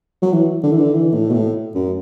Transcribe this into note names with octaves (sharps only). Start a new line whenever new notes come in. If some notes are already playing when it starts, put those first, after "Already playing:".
F#3
E3
D3
E3
D3
E3
A2
B2
A2
F#2